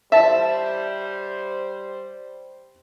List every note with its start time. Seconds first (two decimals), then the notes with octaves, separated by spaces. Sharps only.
0.12 G3 C5 E5 A5